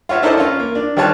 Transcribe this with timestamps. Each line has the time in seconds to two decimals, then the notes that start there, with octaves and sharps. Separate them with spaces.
0.09 F4 F#4 C#5 E5
0.22 D4 E4 A4 A#4 C5 D#5
0.37 C#4 F4
0.60 A#3
0.75 D4
0.97 D#3 G3 F4 C#5 A5 F#6